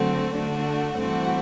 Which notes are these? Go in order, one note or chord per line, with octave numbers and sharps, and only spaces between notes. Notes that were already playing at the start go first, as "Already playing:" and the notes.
Already playing: D3 F#3 A3 C4 F#4
D3 A3 D4 F#4
G2 E3 A3 C4 F#4